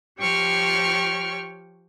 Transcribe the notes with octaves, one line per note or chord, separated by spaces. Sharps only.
F3 G4 C#5 G5 C#6 F6